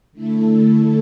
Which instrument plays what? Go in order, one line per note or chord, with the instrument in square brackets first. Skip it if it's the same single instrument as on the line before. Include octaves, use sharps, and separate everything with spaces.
[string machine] D3 A3 E4 A4